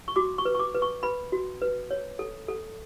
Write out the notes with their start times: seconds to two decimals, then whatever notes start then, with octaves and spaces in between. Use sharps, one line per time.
0.08 C#6
0.16 F#4 D6
0.38 C#6
0.45 B4
0.55 C#6
0.59 D6
0.75 B4
0.82 C#6
1.03 B4 B5
1.32 F#4
1.62 B4
1.91 C#5
2.19 A4
2.48 A4